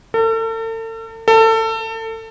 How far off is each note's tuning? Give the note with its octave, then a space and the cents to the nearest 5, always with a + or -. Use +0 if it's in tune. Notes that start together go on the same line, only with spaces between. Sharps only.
A4 +40
A4 +25